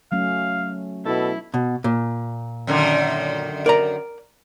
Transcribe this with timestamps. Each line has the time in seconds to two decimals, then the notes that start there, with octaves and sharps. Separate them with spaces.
0.12 F#3 A3 C#4 F5
1.05 B2 E4 A4
1.54 B2
1.84 A#2
2.67 F#2 D3 D#3
3.66 A#4 D5 A#5